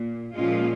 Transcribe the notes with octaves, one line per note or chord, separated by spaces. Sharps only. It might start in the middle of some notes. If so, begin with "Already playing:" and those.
Already playing: A#2
A#2 F3 G#3 C#4 F4